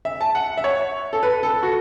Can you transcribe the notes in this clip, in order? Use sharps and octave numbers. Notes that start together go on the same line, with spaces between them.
E5
A5
F#5
E5
C#5
A4
B4
A4
F#4